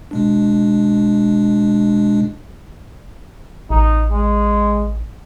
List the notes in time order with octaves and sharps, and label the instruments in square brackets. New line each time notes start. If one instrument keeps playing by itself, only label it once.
[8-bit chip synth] B2 G#3 D4
[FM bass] A1 [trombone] D#4
[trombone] G#3